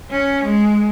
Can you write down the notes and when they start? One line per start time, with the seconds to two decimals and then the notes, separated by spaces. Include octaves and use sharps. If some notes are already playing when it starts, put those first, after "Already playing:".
0.10 C#4
0.44 G#3